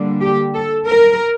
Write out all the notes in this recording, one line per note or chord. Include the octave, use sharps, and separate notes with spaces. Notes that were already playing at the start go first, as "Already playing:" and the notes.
Already playing: D3 G3 A#3 D4
G4
A4
A#4